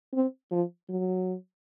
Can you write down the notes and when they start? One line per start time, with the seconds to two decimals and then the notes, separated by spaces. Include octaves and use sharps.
0.13 C4
0.51 F3
0.89 F#3